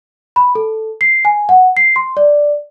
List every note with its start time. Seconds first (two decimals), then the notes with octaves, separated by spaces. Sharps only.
0.36 B5
0.55 A4
1.01 C7
1.25 G#5
1.49 F#5
1.77 C7
1.96 C6
2.17 D5